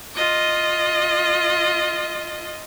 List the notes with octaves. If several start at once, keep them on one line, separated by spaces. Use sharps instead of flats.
F4 D#5